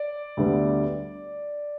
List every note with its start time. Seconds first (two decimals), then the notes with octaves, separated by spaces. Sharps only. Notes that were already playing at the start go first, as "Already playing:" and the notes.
Already playing: D5
0.37 D2 D3 G3 B3